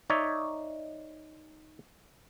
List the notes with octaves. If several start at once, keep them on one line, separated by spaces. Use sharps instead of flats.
D#4 C#5 D5 E5